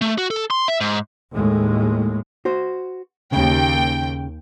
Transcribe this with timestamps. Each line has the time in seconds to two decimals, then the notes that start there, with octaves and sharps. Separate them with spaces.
0.02 A3
0.18 F#4
0.31 A4
0.50 C6
0.68 E5
0.81 G#2
1.32 D#2 A2 G#3
2.45 F#4 C5
3.32 D#2 C#3 G5